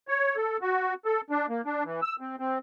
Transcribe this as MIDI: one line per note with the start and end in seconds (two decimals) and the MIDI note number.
0.08 0.36 73
0.36 0.57 69
0.62 0.94 66
1.05 1.21 69
1.30 1.46 62
1.49 1.61 58
1.65 1.84 62
1.85 2.00 52
2.02 2.16 88
2.20 2.36 60
2.39 2.58 60